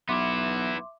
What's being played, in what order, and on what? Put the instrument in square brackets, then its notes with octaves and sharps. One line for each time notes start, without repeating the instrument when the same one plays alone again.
[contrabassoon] B1 [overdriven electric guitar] B3 E4 [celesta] E5 C6 D6